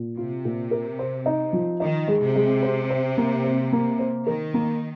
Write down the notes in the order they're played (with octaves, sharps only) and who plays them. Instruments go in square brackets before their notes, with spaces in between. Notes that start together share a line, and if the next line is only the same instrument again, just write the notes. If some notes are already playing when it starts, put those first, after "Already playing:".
Already playing: [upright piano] A#2
[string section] C3 [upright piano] F4
[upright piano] A#2
A#4
C5
D#4
F3
[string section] D#3 [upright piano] D#4
[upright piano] G#3
[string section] C3
[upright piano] G#3
C5
C5
A#3
C5
A#3
C5
[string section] D#3 [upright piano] A#4
[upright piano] A#3